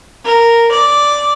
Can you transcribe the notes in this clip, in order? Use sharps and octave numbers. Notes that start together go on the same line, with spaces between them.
A#4
D5